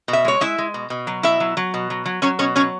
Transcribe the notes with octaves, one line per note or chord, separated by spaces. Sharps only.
B2
E5
G#3 C#5
G#3 E4 E5
G#3
B2
B2
F#3
B2 E4 E5
F#3
F#3
B2
F#3
F#3
F#3 C#4 C#5
B2 C#4 C#5
F#3 C#4 C#5